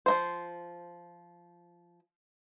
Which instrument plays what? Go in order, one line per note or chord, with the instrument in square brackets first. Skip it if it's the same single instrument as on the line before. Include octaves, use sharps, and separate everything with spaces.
[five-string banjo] F3 A#3 C5